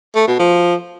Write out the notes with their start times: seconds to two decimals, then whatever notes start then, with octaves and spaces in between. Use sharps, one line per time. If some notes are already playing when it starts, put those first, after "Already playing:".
0.15 A3
0.27 B2
0.39 F3